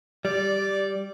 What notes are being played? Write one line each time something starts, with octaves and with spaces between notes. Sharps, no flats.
G3 D5